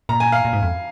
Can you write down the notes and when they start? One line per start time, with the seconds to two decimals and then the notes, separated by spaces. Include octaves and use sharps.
0.09 A#2 A#5
0.20 G#5
0.32 F5
0.45 A#2
0.53 G#2
0.63 F2